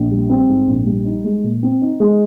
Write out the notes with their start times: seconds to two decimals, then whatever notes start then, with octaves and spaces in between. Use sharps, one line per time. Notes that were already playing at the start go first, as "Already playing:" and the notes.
Already playing: A#1
0.11 G3
0.30 C4
0.48 G#2
0.68 A#1
0.86 G3
1.05 D#4
1.24 G#3
1.44 A#2
1.63 C4
1.81 D#4
2.00 G#3